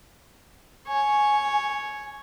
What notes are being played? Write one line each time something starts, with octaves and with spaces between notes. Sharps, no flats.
C#5 G#5